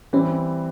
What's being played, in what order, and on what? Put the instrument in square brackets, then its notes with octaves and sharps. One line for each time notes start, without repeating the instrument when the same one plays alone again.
[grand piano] E3 G3 C4 [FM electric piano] C#4